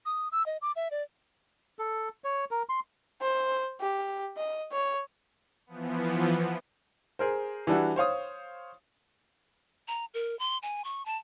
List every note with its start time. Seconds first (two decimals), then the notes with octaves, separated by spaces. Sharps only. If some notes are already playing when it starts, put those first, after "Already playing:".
0.06 D#6
0.32 E6
0.46 D#5
0.62 D6
0.76 E5
0.91 D5
1.79 A4
2.24 C#5
2.51 A#4
2.69 C6
3.21 C5
3.81 G4
4.37 D#5
4.72 C#5
5.67 E3 F3 B3
7.19 G#4 A#4 C5
7.67 E3 G3 D4 E4 F#4
7.96 C5 C#5 F5 D#6
9.88 A#5
10.14 A#4
10.39 C6
10.63 G#5
10.85 C#6
11.06 A5